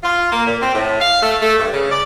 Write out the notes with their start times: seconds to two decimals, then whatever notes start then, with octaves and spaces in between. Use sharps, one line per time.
0.03 F4
0.32 A#3
0.46 A#2
0.62 C4
0.75 A2
1.00 F5
1.21 A3
1.42 A3
1.58 G2
1.73 C#3
1.91 D5